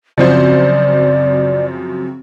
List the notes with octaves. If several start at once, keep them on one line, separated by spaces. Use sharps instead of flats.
F#2 C#3 F3 C4 F#4 C5 D5